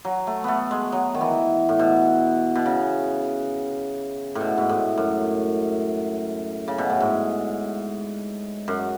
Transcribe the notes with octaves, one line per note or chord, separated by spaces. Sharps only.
F#3
A3
A3 B3
G#3
F#3
D#3
E3
A2
B2
B2
C#3
A2
B2
G#2
A2
F#2
C#3
B2
A2
G#2
F#2